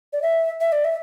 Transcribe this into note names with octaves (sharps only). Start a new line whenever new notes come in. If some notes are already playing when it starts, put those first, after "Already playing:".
D5
E5
E5
D5
E5